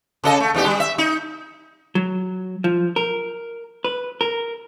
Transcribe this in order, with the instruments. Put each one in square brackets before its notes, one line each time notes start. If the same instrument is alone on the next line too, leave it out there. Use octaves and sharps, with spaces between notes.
[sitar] C#3 A4 D#5
A3
E2 D#4 G4
G3
E5
D#4
[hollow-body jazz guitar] F#3
F3
A#4
B4
A#4